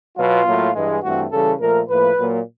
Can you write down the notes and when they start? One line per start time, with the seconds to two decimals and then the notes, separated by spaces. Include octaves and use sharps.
0.18 B2 F#3 B3 F4
0.46 A2 F#3 A#3
0.74 G2 E3 G#3
1.03 G2 E3 A3 C4 F#4
1.31 C#3 E3 G3 A4
1.60 A#2 F3 A3 A#4
1.88 A2 F3 A#3 B4
2.17 A#2 F#3 A#3